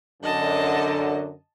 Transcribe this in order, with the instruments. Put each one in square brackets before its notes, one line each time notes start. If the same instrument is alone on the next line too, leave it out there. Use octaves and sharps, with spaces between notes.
[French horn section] F#2 D3 [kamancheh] D#5 A5